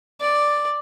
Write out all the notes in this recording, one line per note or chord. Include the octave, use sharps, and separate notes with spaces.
D5